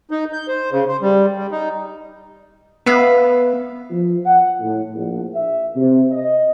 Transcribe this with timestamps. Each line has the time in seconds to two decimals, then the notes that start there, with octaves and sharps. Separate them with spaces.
0.11 D#4
0.33 G6
0.48 C5
0.72 C#3
0.88 C5
1.02 G3
1.38 G3
1.51 D#4
2.86 B3 B4 E5 F5
3.90 F3
4.25 F#5
4.61 A2
4.94 A#1
5.34 E5
5.75 C3
6.11 D#5